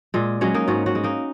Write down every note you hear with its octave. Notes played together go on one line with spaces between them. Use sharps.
A#2 G#3
F#3 G#3 C#4
A#3 D#4
G#2 C#4 F#4
C#4 F#4
G#3
A#3 D#4